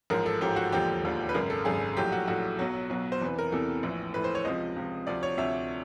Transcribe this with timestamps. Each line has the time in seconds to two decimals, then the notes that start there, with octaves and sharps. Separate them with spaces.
0.10 A1 G#2 F3 A#4
0.26 A4
0.41 A1 G#2 F3 G4
0.56 F#4
0.72 E1 D#2 D3 F3 G4
1.03 E1 D#2 D3 F3
1.29 B4
1.34 G#1 F#2 C#3 A#4
1.50 A4
1.65 G#1 F#2 C#3 G#4
1.97 A#1 A2 F#3 G4
2.12 F#4
2.28 A#1 A2 F#3 F#4
2.59 B1 B2 F#3
2.90 B1 B2 F#3
3.12 C5
3.21 E2 C3 E3 B4
3.39 A#4
3.52 E2 C3 E3 A4
3.83 A#1 A2 E3
4.14 A#1 A2 E3 B4
4.24 C5
4.35 C#5
4.45 C#2 C3 F3 D#5
4.76 C#2 C3 F3
5.07 D2 C3 F3 D5
5.23 C#5
5.37 D2 C3 F3 E5